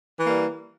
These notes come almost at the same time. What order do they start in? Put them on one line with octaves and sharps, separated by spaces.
E3 A#3 G3